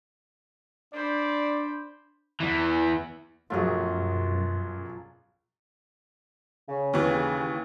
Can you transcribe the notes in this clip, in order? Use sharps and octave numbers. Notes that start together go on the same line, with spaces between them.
D4 C5 D5 B5
E2 E3
A#1 F#2 B2 F#3 A3 F4 G#4
C#3
D#2 E3